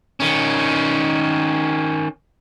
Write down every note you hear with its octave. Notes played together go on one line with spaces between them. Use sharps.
D#3 C#4